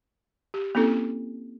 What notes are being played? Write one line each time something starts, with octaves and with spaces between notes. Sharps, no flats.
G4
A#3 C4 C#4 E4 A4